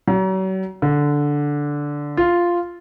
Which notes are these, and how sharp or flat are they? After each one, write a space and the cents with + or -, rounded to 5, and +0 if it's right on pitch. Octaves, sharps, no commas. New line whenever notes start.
F#3 +40
D3 -5
F4 -5